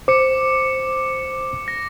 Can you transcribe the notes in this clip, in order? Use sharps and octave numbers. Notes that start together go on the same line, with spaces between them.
C5 D6 C#7
A#6